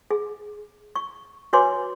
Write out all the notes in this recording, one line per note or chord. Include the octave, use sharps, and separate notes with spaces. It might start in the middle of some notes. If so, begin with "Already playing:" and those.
G#4
C#6
F#4 B4 C#5 G#5 C6 D6